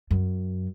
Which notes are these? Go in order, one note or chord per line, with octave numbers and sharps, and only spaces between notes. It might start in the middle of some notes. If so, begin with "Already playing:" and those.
F#2